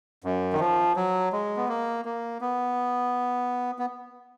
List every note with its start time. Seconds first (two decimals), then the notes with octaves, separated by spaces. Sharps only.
0.24 F#2
0.53 D#3
0.60 F3
0.96 F#3
1.33 G#3
1.57 B3
1.69 A#3
2.05 A#3
2.41 B3
3.79 B3